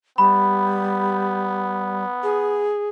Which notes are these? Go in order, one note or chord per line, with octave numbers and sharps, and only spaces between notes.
G3 B3 B5
G#4